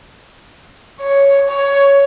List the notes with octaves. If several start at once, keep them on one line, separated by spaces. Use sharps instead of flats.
C#5
C#5